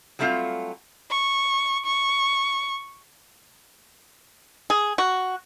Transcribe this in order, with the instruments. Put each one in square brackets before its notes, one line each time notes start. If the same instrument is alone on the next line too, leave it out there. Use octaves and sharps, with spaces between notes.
[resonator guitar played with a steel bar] F#3 G3 A3 C4 E4 F4
[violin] C#6
C#6
[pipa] G#4
F#4